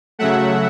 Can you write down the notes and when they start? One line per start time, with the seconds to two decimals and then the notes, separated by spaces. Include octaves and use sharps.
0.19 C#3 F#3 A3 E5 F#5